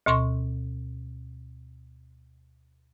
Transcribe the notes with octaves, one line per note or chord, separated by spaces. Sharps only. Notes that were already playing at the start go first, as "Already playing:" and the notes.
D2 B2 C6 C#6